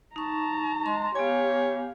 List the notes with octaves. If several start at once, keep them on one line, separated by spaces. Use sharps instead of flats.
D#4 A5 A#5 C#6
G#3 C6
B3 G4 C#5 F5 G#5